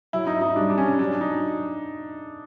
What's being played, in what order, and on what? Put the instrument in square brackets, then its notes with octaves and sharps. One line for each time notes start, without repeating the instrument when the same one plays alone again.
[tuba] F#3 [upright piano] E4
[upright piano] D#4
D#4
[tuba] G3 [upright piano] D4
[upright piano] D4
C#4
[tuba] F#3 [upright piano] D4
[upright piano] D#4